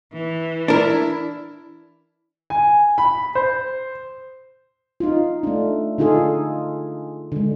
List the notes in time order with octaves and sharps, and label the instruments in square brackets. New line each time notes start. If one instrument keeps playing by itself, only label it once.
[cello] E3
[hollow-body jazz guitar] D4 A#4 [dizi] E4
[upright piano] G#5
B5
C5
[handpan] D#4 F4
A3 D4
D3 D#4 F4 G#4 A4
D3 G#3